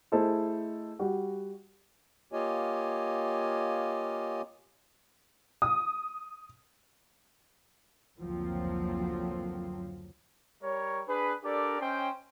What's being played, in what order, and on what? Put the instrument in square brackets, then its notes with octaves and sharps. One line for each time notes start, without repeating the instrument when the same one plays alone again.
[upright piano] A3 E4 G#4 A4 C5 D#5
G3 F#4
[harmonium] A#3 F4 G4 C#5 D#5 G#5
[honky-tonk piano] D#6
[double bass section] F#1 D2 F3 F#3 A#3 C4
[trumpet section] G3 A#4 C#5
D4 G#4 B4
D4 G4 A4 A#4 D5
C#4 C5 D#5 G5